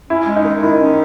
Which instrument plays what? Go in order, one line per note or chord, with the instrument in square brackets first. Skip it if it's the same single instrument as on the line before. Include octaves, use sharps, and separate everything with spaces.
[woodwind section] C#4 [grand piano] E4
[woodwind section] G#3
[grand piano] D#4
[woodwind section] D#3
[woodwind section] D#3 [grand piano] E4
[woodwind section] C#4